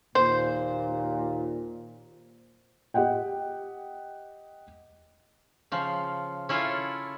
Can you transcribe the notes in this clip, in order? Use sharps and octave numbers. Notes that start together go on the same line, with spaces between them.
D#2 A#2 C5
G4 D#5 F#5 G5
C#3 F3
C#4 E4 F4 A4